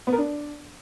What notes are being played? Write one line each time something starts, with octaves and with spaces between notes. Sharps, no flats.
B3
A#4
D4